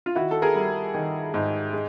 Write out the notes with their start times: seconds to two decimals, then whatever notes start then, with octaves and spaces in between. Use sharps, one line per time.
0.06 F4
0.15 D#3 E4 F#4
0.31 A4
0.42 G#4 A#4
0.55 G3
0.94 D#3
1.34 G#2
1.73 G#3